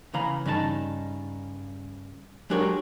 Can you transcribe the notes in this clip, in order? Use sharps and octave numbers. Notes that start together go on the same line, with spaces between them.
C#3 E3 F5 A#5 B5
G2 C#3 D#4 A4 A5
F#3 G#3 D4 G4 A#4 C#5